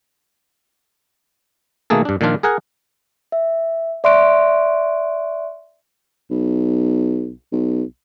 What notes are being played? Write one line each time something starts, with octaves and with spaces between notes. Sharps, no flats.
B2 D#3 A3 A#3 G#4 A4
G2 D4
A#2 D#3 F3 D4 F4
G#4 A#4 F#5 G#5
E5
D5 E5 C6 C#6 F#6 D7
B1
B1